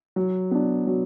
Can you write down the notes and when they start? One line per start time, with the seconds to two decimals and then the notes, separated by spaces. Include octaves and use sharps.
0.16 F#3
0.51 B3 D4
0.87 F#3